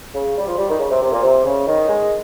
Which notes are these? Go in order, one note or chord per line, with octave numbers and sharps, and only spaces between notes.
C#3
G3
F3
G3
D#3
C#3
C3
C3
A#2
C3
C#3
D#3
G#3